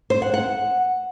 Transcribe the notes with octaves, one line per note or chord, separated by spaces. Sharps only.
C5
F#5
F#5